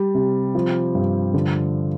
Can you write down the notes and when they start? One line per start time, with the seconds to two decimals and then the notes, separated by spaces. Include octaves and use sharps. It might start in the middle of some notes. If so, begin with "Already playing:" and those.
Already playing: G3
0.15 C3
0.55 F3
0.95 G2
1.34 D3